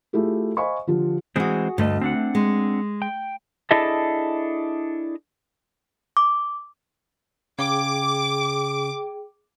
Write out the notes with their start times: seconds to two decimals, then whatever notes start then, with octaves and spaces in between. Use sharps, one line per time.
0.13 A3 E4 F4 G4 G#4
0.57 C5 D#5 F5 G#5 B5 C#6
0.87 D3 F3 D4 F4 G4
1.36 E3 G#3 C4 F#4 G#4
1.78 D2 G2 A3 D#5
2.01 C4 D4 F#5
2.35 G#3
3.02 G5
3.71 D4 E4 G#4 A4 D#5 E5
6.17 D6
7.59 C#3 G#4 G5 D6